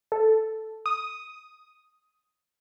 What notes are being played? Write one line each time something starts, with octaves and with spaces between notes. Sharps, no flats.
A4
D#6